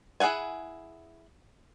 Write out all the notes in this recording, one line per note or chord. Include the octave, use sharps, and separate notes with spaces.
E4 G#4 F5 F#5 G#5